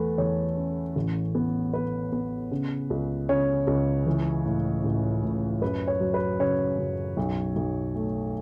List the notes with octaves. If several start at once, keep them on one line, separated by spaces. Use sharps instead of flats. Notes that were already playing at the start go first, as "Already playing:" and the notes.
Already playing: E2 A3 A4 B4
E2 C#5
C#4
A1
B3
B3 B4
B3
C#3
C#2
C#3 C#5
C#2
E3
A2
A1
A2
F#2 B4
C#5
F#3
B4
C#3 C#5
F#2
B1
B1
A3